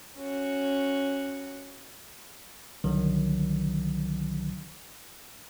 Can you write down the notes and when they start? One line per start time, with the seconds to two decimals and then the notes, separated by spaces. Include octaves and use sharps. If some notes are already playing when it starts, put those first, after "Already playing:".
0.17 C#4 F#4
2.84 C2 D3 D#3 F#3